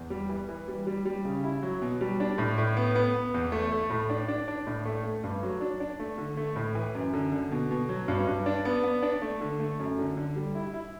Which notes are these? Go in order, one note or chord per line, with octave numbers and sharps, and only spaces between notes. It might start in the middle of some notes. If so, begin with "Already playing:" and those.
Already playing: E2
G3
E3
E3
G3
G3
G3
C#3
E4
F#3
B2
G3
D4
A2
A2
B3
B3
B3
E2
A3
A3
A2
D4
D4
D4
A2
A3
A3
G2
F#3
D4
D4
A3
D3
A3
A2
E3
F#2
D3
D3
B2
B2
F#3
G2
G2
D4
B3
B3
D4
A3
D3
A3
F#2
D3
D3
G3
E4
E4